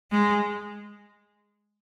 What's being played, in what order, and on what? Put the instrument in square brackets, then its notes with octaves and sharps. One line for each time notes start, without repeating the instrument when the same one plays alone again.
[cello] G#3